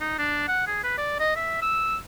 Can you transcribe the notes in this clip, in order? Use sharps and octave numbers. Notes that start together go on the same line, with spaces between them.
D#4
D4
F#5
G#4
B4
D5
D#5
E5
E6